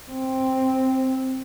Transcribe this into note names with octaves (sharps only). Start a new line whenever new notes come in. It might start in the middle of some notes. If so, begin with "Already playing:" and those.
C4